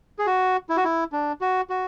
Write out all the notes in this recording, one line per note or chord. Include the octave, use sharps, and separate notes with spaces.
G#4
F#4
E4
F#4
E4
D4
F#4
F#4